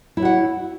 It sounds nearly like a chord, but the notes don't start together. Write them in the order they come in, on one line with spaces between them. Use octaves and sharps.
E4 C#5 F#4 F#5